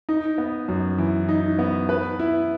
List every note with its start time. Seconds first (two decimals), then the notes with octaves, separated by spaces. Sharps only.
0.09 D#4
0.38 B3
0.68 F#2
0.98 E3
1.29 D#4
1.59 B3
1.89 B4
2.19 E4